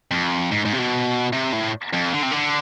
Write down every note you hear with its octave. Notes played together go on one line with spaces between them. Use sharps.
F2
G#2
G#2
C3
B2
C3
A2
F2
D3
C3
D3